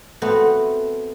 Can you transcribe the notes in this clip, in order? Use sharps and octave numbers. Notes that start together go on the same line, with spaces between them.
A3 B3 C4 F#4